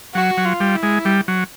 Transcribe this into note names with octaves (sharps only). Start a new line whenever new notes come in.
F#3 F#4
F#3
F4
G3
E4
G#3
G3
F#3